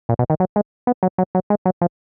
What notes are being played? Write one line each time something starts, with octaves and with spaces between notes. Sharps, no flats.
A#2
B2
D#3
F#3
G#3
B3
F#3
F#3
F#3
G#3
F#3
F3